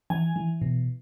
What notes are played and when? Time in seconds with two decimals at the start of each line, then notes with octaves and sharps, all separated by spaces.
0.10 E3 G#5
0.36 E3
0.62 B2